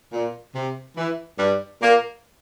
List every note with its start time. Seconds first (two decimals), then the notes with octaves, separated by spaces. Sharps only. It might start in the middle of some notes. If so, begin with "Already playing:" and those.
0.13 A#2
0.55 C3
0.97 E3
1.39 G2 G3
1.81 A#2 A#3